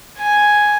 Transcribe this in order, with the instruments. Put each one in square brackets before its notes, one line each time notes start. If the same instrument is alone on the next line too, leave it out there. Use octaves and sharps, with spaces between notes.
[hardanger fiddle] G#5